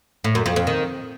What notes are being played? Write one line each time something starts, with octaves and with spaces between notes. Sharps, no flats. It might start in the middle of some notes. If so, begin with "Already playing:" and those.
A2
F#2
F2
F2
D#3